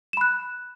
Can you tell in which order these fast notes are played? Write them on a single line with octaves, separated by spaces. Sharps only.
E7 B5 F#6